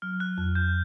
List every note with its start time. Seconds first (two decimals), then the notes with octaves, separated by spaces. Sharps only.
0.02 F#3 F6
0.20 F#6
0.38 F2 F#6
0.55 G6